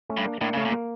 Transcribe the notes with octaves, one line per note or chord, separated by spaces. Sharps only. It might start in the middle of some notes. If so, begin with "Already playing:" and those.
A3 C#4
G2
A#3 D4
A2 A#3 D4
C#3 A3 C#4
A#2
A#3